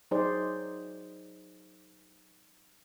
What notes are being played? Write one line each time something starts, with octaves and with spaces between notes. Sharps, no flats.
F#3 D#4 G#4 C5 D5